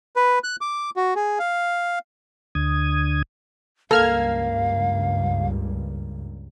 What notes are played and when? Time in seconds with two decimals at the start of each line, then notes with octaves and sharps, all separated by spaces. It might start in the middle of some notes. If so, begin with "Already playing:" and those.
0.16 B4
0.44 F#6
0.61 D6
0.96 F#4
1.16 G#4
1.39 F5
2.55 D2 D3 D#6 G#6
3.91 C#2 G2 A#3 A4 F5 F6 G#6